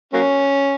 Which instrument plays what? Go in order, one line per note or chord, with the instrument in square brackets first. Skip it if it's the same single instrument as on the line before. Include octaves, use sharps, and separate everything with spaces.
[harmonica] F#3 A#3 C#4